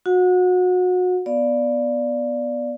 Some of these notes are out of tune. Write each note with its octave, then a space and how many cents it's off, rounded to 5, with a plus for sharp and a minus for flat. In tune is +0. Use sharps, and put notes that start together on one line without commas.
F#4 -25 F#5 -30
B3 +0 D5 +0 F5 +0